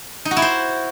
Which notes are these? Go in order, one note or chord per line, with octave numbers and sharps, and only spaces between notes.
D#4
F#4
E4
C5